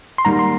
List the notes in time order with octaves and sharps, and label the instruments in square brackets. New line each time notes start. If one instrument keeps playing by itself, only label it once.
[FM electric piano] C6
[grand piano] G#2 D#3 G3 A#3 [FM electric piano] A#5
[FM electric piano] C6